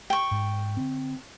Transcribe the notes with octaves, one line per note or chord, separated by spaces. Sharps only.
G5 C#6
G#2
D3 C4